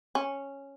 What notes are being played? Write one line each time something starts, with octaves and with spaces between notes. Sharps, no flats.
C#4